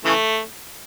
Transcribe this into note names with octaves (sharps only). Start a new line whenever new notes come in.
C#3 E3 A3